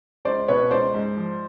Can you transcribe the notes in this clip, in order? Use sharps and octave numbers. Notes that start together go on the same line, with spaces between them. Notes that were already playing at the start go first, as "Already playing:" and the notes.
C#2 C5 D5
B2 B4 C#5
C#2 C5 D5
G#2
F3